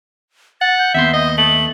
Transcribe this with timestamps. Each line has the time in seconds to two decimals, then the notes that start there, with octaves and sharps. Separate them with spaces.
0.61 F#5 A6
0.79 G6
0.95 D#2 B3 E5 C6
1.14 D#5 D#6
1.38 A3 F#7